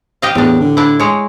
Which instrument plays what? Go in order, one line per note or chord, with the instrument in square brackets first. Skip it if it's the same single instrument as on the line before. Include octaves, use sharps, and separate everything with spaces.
[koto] G4 D#5 F5
[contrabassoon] E2 [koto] A2 D4
[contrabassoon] D3
[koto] D4 E4
G#3 C#5